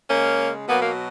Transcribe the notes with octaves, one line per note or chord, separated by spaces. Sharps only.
C#3 G#3 A#3 C#4
B2 F#3 A#3 B3
A#3